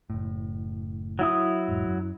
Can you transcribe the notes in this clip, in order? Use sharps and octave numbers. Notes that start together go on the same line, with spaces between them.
F#1 A2
F#3 E4 D#6
E1 G#2
F#2